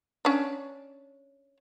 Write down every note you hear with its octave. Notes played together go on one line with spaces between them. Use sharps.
C#4 D4